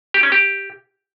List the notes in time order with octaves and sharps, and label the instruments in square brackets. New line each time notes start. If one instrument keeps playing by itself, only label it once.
[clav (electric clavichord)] G4
C#4
G4